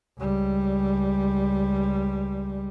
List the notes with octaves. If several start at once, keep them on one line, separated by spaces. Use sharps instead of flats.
C#2 G3